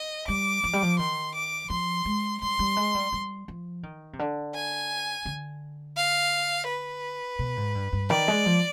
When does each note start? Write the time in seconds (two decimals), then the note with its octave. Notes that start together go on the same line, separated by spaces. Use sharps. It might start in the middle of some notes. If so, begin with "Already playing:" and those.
Already playing: D#5
0.28 G3 D6
0.64 F3
0.73 G3
0.82 F3
0.99 D#3 C6
1.35 D6
1.70 F3 C6
2.05 G#3
2.42 G3 C6
2.59 G3
2.77 G#3
2.95 G3
3.13 G3
3.48 F3
3.83 D#3
4.13 C3
4.19 D3
4.55 G#5
5.25 D3
5.97 F5
6.68 B4
7.39 B2
7.57 G#2
7.75 G2
7.93 G2
8.10 D#3 D5
8.28 G#3
8.46 F3